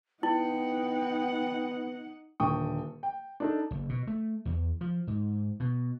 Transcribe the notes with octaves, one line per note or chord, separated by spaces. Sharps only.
B3 D#4 E4 F#5 G5
D#1 D3 G5 C#6 D#6
G5
D4 D#4 A4
F#1
B2
A3
E2
F3
G#2
B2